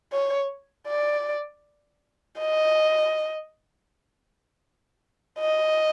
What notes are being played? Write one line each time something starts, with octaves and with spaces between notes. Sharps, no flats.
C#5
D5
D#5
D#5